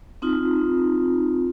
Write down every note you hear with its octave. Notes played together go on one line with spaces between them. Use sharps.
C4 D#4 F4